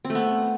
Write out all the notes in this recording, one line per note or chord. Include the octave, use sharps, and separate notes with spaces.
C4
A3
B3